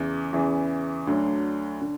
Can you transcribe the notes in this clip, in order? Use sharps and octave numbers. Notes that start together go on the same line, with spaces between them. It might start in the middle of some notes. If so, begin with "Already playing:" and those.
Already playing: E2 C#3 E3
E2 C#3 E3
D2 D3 F#3
D3